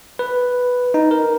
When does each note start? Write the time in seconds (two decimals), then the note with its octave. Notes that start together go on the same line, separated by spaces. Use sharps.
0.19 B4
0.94 D#4
1.11 A#4